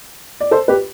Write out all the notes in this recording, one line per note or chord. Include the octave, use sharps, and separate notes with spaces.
D5
A4 C5
G4 B4